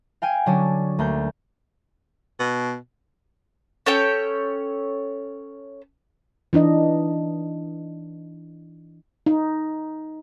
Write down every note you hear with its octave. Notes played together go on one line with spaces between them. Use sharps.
F5 G5 G#5
D3 F#3 C#4 D4
D2 A3 A#3 G6
B2
C#4 A4 C#5 G5
E3 D4 D#4 D#5
D#4